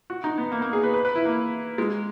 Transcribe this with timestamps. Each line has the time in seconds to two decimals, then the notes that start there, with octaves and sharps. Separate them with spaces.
0.10 F#4
0.24 D#4
0.38 B3
0.52 A#3
0.62 A#3
0.73 G#4
0.84 B4
0.94 B4
1.05 B4
1.15 E4
1.25 A#3
1.78 G#3